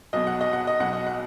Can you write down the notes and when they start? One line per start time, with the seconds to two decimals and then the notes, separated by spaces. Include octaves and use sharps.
0.13 B1 B2 D#5
0.27 F#5
0.41 D#5
0.53 F#5
0.67 D#5
0.80 B1 B2 F#5
0.93 D#5
1.06 F#5